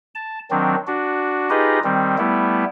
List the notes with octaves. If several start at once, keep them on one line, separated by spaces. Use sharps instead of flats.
A5
D#3 F#3 C4 D4
D4 F#4
D#4 F4 G4 G#4 B4 D#5
D#3 G3 C4
G3 A3 B3 E4